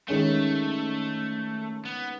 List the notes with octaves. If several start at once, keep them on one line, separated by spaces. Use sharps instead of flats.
D#3 G#3 A3 C#4
B3